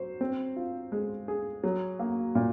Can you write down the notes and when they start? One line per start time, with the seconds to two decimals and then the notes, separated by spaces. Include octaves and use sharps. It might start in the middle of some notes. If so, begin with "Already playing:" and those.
Already playing: F#3 C5
0.21 C4
0.57 F4
0.92 G#3
1.28 G#4
1.64 F#3
1.99 A#3
2.35 A#2